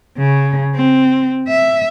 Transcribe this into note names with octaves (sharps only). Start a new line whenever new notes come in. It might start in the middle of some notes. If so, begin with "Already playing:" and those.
C#3
C4
E5